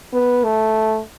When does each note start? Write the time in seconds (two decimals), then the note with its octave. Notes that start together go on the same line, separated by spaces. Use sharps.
0.13 B3
0.44 A3